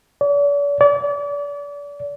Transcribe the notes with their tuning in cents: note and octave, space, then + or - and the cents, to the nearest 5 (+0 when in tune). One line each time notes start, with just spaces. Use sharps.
D5 -45
D5 -35